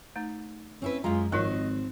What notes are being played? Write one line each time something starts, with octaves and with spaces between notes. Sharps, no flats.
A3 D#4
C4 C#4 E4 B4
F#2 G#3 F4 A#5
G#1 F3 C4 F4 A#4 D#5 F#6